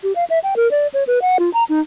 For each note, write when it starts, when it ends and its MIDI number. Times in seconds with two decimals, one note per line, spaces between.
0.03 0.13 67
0.16 0.25 77
0.30 0.39 76
0.44 0.54 79
0.56 0.70 70
0.71 0.87 74
0.94 1.04 73
1.07 1.22 71
1.22 1.37 78
1.39 1.52 65
1.54 1.64 82
1.69 1.80 63